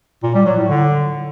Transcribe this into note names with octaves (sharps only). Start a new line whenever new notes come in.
A#2
G3
F#3
A2
D3